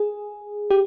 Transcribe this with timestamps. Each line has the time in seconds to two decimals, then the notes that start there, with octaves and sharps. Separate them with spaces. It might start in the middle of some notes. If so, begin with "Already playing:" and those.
Already playing: G#4
0.71 G4